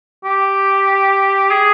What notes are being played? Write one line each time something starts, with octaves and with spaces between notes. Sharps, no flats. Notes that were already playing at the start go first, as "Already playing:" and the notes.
G4
G#4